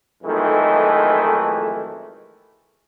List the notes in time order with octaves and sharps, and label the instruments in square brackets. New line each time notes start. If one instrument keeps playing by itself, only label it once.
[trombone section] B1 F2 D#3 E3 G#3 A3